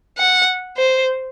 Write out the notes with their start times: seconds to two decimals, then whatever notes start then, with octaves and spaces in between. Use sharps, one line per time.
0.18 F#5
0.77 C5